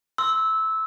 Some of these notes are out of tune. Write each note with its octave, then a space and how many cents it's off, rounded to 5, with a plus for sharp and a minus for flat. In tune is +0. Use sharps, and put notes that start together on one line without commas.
C6 +0 E6 -15